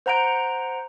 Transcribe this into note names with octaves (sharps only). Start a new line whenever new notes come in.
C5 F#5 A#5 G6 D7